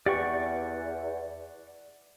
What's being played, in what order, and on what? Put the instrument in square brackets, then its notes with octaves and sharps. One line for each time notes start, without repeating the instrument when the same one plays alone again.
[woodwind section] E2 [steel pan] G4 [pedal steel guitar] D5 F#5 C#6